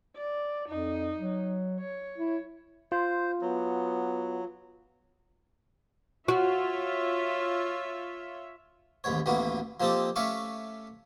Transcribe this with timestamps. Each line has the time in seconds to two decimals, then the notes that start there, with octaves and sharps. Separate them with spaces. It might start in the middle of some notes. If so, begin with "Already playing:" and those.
0.16 D5
0.69 F2 D#4
1.19 F#3
1.80 C#5
2.18 E4
2.92 F4 C5
3.41 F#3 B3
6.28 F4 F#4 C#5 E5
9.04 A1 D#2 G#2 C#5
9.26 A1 D2 A2 A#3 B3 F#4
9.80 F3 A#3 C4 G4 A4 D#5
10.16 A3 C#4 E5 F5 C#6 D6